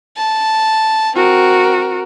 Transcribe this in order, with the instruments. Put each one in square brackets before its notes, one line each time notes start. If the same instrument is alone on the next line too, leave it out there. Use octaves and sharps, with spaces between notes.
[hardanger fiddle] A5
[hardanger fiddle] C4 [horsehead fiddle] F#4 A#4